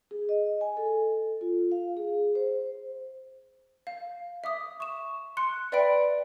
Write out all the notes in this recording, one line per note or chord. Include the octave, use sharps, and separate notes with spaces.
G#4
D#5
G#5
A4
F4
F5
G#4
C5
F5
E5 D6 D#6
C#6 E7
C6 F#6 C#7
B4 D5 E5 G5 B5 D7